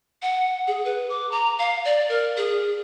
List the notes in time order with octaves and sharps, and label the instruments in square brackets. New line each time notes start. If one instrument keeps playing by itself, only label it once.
[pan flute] F#5
G#4
B4
D6
A#5
F5
D5
A#4
G#4